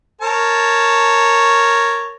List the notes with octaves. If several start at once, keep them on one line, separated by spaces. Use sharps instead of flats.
A#4 C#5 A5